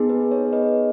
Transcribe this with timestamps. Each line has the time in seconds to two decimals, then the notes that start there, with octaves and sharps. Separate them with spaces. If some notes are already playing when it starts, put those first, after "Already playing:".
Already playing: B3 D#4 G#4
0.10 B4
0.31 C#5
0.53 B4 D#5